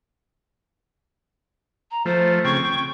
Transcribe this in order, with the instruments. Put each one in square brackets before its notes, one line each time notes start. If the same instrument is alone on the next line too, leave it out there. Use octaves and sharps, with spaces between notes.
[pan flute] A#5
[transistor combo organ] F3 A3 [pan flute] C5
[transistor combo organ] C#3 C4 G5 [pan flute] C#6
[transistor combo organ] G5